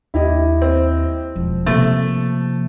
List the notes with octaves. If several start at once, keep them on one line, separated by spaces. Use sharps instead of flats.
D#2 E4 G4 D#5
C4
E1 F3
C3 A3 A#3 A6